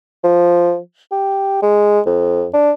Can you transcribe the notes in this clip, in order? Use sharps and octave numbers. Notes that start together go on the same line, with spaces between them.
F3
G4
G#3
F2
D4